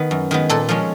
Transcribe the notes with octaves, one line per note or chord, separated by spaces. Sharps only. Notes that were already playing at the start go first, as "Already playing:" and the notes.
Already playing: D#3 B3 B4
F#2
D#3 G#3 B3
A#2 A4
F3 G#3 C#4